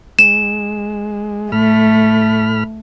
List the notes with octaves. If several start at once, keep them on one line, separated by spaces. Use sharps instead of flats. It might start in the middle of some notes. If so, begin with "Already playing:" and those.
G#3 E7
A2 A3 B5 F6